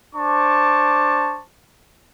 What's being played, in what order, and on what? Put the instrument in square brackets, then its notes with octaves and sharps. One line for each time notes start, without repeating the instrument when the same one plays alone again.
[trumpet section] D4 C5 A5 C#6 D6